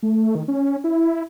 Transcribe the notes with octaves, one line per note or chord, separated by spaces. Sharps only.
A3
D#3
C#4
E4